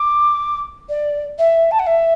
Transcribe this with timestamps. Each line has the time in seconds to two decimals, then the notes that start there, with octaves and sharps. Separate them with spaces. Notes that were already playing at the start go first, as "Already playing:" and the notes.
Already playing: D6
0.89 D5
1.39 E5
1.71 A5
1.79 F#5
1.87 E5